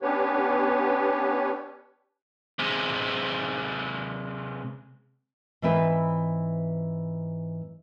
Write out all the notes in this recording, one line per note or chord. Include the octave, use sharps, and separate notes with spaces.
B3 C#4 D4 G4 B4 C#5
C3 G#3
G#2 E3 C4 B4 E5